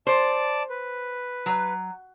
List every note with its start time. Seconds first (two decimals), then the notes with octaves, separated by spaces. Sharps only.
0.07 C5 D5 A5
0.70 B4
1.46 F#3